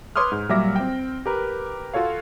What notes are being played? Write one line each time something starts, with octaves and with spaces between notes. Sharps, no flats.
B4 C#5 C6 D6 D#6 F6
G#2
A#2 F#3 G3 E5 D6 A#6
C4 G5
G4 A#4 B4
F4 F#4 A4 C#5 F5